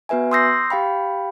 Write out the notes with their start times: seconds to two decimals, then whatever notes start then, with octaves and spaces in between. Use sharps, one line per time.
0.09 B3 F#4 B4 E5 G#5
0.31 C6 D#6 E6 G6 A#6 C7
0.70 G4 F5 G5 B5